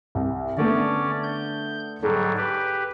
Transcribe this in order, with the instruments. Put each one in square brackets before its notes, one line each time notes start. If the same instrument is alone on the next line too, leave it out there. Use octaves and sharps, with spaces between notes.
[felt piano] C2
[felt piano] D3 A3 B3 [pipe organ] C#4 D5
[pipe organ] G6
[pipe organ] G#2 F#3 G3 [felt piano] G#4 A4
[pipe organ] G4 B4